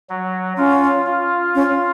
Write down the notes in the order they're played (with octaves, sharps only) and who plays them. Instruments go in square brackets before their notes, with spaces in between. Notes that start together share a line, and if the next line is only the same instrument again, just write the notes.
[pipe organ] F#3
[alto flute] C#4 [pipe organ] F4
[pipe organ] F4
[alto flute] C#4